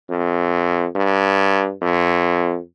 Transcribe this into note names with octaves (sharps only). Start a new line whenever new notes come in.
F2
G2
F2